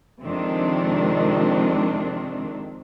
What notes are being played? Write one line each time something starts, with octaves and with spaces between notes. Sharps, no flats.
F2 C3 D#3 G#3 C4 D4